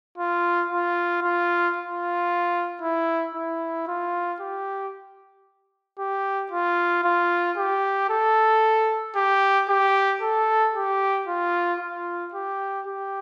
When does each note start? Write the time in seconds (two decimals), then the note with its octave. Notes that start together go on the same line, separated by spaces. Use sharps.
0.18 F4
0.70 F4
1.23 F4
1.77 F4
2.82 E4
3.35 E4
3.87 F4
4.40 G4
5.99 G4
6.52 F4
7.04 F4
7.57 G4
8.10 A4
9.16 G4
9.69 G4
10.22 A4
10.74 G4
11.28 F4
11.80 F4
12.33 G4
12.86 G4